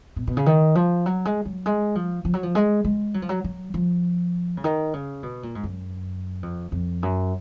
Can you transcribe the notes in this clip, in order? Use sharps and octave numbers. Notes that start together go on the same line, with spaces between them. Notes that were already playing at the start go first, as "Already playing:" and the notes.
B2
B2
C#3
D#3
F3
F#3
G#3
F#3
G#3
F3
F3
F#3
F3
G#3
G#3
F#3
F3
F#3
F#3
F3
C#3
D#3
C#3
B2
A#2
G#2
F#2
F2
F2
F#2